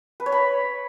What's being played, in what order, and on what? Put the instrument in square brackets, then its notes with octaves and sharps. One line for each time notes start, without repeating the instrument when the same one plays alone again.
[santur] B4
C#5
B5